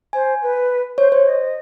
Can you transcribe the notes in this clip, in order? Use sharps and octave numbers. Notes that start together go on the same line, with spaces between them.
C5 G#5
B4
C5 C#5
C5 C#5
D#5